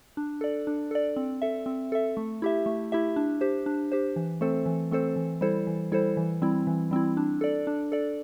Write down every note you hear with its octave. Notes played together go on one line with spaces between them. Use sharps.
D4
A4 D5
D4
A4 D5
C4
A4 E5
C4
A4 E5
A3
E4 G4 E5
A3
E4 G4 E5
D4
G4 C5
D4
G4 C5
E3
A3 C4 A4 C5
E3
A3 C4 A4 C5
E3
G3 E4 A4 C5
E3
G3 E4 A4 C5
E3
G3 C4 E4
E3
G3 C4 E4
D4
A4 D5
D4
A4 D5